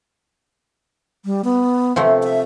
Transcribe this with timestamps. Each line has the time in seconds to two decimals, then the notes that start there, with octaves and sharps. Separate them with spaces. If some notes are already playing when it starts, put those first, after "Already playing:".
1.25 G3
1.44 B3
1.96 C3 F3 A3
2.23 E5